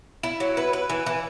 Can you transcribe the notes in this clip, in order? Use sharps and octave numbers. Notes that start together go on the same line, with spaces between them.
E4
F#3
B4
B4
E3
E3